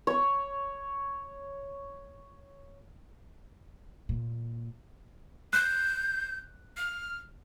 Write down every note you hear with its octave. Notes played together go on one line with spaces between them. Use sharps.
C#5 C#6
A#2
F#6 G6
F6